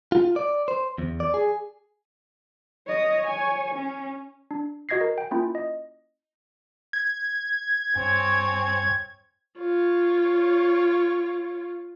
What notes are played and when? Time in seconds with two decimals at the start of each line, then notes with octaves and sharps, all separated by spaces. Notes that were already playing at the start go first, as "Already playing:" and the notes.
0.12 F4
0.36 D5
0.68 C5
0.98 E2
1.20 D5
1.34 G#4
2.87 C#5 D#5
3.27 C#5 G#5
3.75 C#4
4.51 D4
4.89 F#4 D#5 G#6 A#6 C7
5.01 A#4
5.18 G5
5.31 A#3 C#4 E4 F4
5.55 D#5
6.93 G#6
7.96 G2 C4 C#5 G#5
9.59 F4 C#5